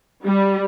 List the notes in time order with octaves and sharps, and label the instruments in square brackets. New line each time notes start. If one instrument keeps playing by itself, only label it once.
[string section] G3